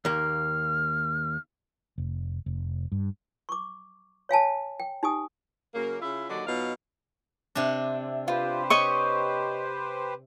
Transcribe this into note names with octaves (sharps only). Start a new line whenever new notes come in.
D#2 A#3 F6
F1
F1
G2
C#6 D6
C#5 F5 G#5 A5
G5
D#4 G4 G#5 D#6
C#3 F#3 A#3
C#3 E4 F4 E5
D#2 D3 F#3 D5 D#5
B2 F#3 D#4 F4 F5
C3 D4
F4 G4 B4 C5
C#5 D#5 C#6